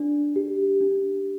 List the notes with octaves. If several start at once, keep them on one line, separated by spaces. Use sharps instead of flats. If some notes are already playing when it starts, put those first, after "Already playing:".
Already playing: D4
G4
D4